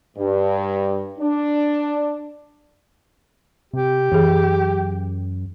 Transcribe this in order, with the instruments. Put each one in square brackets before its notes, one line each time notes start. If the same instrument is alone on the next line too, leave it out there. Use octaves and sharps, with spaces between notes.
[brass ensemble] G2
D4
[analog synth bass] C3 [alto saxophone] G4
[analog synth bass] F#2 [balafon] E3 G#4